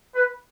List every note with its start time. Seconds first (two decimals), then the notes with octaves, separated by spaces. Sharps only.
0.15 B4